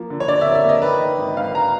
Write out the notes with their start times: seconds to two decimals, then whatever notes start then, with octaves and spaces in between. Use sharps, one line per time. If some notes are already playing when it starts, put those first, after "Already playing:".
Already playing: F3 A#3
0.10 D3
0.20 C#5
0.28 D3 D5
0.41 A#3 E5
0.55 E5
0.64 A#3 D#5
0.82 D#3 B4
1.01 D#3
1.18 G#1
1.37 G#1 F5
1.54 G#1 A#5